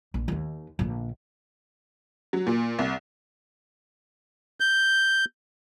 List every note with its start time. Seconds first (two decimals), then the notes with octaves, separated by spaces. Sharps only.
0.14 A#1
0.28 D#2 D#3
0.79 A#1 D3
2.33 F#3
2.47 A#2
2.79 C2
4.60 G6